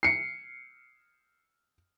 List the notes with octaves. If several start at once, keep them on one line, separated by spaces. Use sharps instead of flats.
C7 C#7